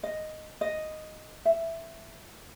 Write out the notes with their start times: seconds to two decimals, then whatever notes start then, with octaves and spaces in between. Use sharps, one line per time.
0.03 D#5
0.61 D#5
1.45 E5